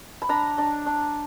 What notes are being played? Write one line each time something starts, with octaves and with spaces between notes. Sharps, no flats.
B5
D4 A#5
D4
D4